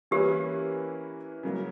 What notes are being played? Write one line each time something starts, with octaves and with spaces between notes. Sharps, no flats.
E3 A#3 C#4 E4 G4 B4
C#3 F#3 A#3